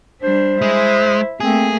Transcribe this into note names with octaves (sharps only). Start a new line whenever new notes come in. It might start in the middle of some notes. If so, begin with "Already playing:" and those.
G3 D4 C5
G#3 E4
A3 A#3 C4 G#4